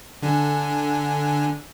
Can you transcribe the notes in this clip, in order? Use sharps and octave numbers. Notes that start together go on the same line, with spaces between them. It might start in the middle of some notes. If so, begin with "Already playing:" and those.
D3 D4 G#5